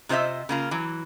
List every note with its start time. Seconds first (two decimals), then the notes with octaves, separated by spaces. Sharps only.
0.09 C3 F4 C5 D#5 E5
0.49 C#3 A#3 F4
0.71 E3 F#3